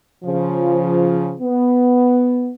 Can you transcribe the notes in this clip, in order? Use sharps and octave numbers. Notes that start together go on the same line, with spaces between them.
C#3 F3
B3